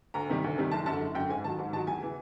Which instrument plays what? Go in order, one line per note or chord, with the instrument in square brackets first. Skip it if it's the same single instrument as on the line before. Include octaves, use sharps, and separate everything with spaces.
[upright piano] D2 A#5
C3 D#3 G3
D2
C3 D#3 G3
F#1 A5
F#2 D3 A5
F#1
F#2 D3 G5
G#2 G#5
D#3 F#3 A5
G#2
D#3 A5
F#3
E2 G#5
C#3 E3